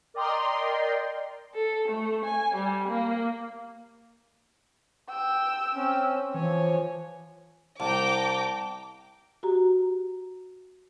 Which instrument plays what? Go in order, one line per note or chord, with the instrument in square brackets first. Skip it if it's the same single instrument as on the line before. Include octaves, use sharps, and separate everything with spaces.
[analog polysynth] A#4 D5 D#5 G5 A#5 C6
[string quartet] A4
A3
G#5
G3
A#3
[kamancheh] G5 E6
[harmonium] C4 C#4
[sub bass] E3 [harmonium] F3 G#5 [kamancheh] C#5
[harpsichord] C2 [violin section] G5 A#5 D6 [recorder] A5
[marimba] F#4 G4 A#5